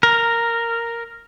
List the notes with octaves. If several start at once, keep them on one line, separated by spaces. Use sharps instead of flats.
A#4